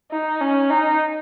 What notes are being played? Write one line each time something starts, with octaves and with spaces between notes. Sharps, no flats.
D#4
C#4
D#4